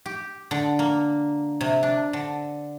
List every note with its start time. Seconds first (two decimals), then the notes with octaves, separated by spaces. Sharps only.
0.06 G4
0.51 D3
0.79 A#3
1.61 C3
1.83 D4
2.13 D3